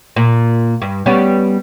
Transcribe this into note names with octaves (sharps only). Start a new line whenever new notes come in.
A#2
G2
G3 B3 C#4